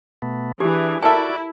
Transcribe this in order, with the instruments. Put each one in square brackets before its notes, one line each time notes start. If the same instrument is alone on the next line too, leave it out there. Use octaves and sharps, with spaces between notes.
[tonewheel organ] B2 A3 B3
[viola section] E3 [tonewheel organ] D4 G#4 [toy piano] G4
[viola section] E4 [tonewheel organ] F#4 D5 [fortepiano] A4 A#4 E5 [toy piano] G#5 A5